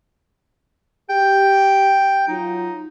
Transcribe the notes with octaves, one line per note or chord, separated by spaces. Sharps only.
G4 G5
F#3 D#4 F4